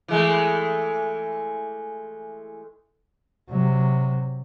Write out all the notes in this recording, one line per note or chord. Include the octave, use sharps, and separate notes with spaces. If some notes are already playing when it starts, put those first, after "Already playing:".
E3 G#3 A3
C3 F#3